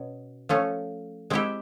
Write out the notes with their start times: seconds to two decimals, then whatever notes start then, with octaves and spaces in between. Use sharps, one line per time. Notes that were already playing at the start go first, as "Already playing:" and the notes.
Already playing: B2 C#4
0.49 F3 A3 C#4
1.30 G#3 C4 E4 G4